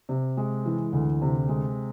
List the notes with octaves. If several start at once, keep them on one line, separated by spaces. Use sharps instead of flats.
C3
G#3
E3
D2
C3
G#3